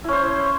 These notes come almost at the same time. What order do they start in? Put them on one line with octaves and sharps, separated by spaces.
E4 C#4 C5